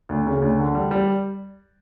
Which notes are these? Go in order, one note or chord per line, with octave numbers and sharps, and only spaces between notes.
D2
C#3
D2
D3
G3
G3